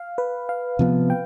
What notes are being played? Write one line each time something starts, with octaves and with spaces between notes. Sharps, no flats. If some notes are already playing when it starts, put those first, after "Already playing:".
Already playing: F5
B4
F5
C3 F3 B3
G5